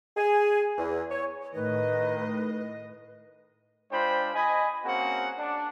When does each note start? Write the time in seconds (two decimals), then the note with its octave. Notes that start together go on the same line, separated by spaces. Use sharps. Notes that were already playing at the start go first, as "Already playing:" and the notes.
0.17 G#4
0.78 E2
1.11 C#5
1.54 A2 D#3 B4 D#5
3.91 G#3 D4 F4 C5 G5 B5
4.35 D#5 G#5 B5
4.85 A#3 C4 C#4 F#4 G#4 F#5
5.39 D4